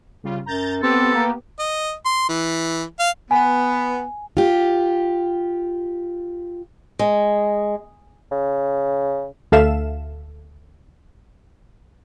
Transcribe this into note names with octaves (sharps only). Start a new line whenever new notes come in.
C#3 G3 F4
F#2 A#5 G6 A6
B3 C4 G4 A4 B4
A#3
D#5
C6
E3
F5
B3 G#5
F4 G4
G#3
C#3
D2 A4 E5 F5 E7